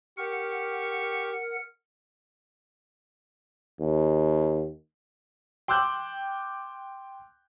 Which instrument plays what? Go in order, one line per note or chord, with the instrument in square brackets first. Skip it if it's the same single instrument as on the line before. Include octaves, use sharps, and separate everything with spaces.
[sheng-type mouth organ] G4 C#6 [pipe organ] A#4 F#5
[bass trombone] D#2
[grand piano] G5 C6 D6 E6 F#6 G6